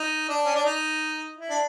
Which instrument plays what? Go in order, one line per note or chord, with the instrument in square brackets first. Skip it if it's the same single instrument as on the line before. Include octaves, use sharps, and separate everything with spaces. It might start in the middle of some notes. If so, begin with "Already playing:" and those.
Already playing: [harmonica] D#4
D4
C#4
D4
D#4
E4
D4